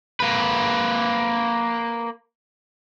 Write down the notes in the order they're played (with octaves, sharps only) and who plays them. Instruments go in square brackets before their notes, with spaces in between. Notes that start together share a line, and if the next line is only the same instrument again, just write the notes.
[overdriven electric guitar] A#3 B4